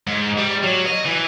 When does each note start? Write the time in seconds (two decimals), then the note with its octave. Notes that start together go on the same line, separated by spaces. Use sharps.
0.07 G#2
0.38 G3
0.64 F#3
0.87 D#5
1.06 E3